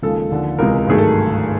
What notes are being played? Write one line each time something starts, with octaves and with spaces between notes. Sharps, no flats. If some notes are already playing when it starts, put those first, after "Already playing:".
D#2 C#3 F3 G#3 A4
D#2 D3 F3
C#2 C3 E3 G#3 A#4
G#1 G2 D#3 F#3 A3 G#4
A4